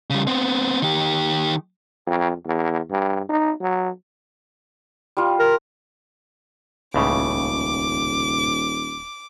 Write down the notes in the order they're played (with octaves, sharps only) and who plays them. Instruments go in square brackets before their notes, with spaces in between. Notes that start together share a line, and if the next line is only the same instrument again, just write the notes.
[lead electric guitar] C#3 G3
B3 C4
D#3 G4
[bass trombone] F2
E2
G2
D#4
F#3
[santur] G3 F4
[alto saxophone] A#4
[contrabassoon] D#1 [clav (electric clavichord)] C#2 A2 C#3 [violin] D6